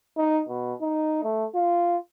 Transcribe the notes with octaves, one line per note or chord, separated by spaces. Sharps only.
D#4
B2
D#4
A3
F4